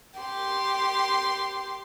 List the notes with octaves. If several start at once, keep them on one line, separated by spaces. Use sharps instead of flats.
G4 C6